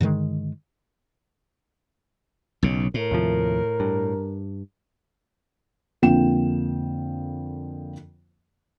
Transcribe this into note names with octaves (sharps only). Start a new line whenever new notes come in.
G2 D3 D#3 G#3
B1 C#3
A2 A#4
D#2 C3 F3
G2
F2 D3 A#3 F4 G5 E7